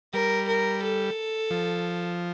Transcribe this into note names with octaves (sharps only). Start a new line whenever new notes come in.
G3 A#4
A#4
A4
F3